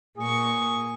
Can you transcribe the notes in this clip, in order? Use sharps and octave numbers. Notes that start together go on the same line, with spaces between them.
A#2 G#4 C#6